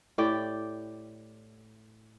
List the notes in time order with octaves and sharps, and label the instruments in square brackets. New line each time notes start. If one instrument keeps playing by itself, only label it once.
[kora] A2 G4 D5 G5